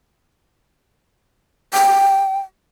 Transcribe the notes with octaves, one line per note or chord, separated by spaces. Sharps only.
G5